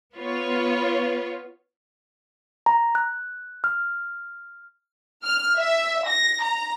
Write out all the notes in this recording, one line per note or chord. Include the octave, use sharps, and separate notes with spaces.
B3 F4 B4 C#5
A#5
F#6
F6
F6
E5
A#6
A#5